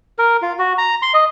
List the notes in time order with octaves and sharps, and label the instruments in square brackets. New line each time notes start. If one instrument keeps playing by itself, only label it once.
[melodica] A#4
F4
F#4
A#5
C6
D#5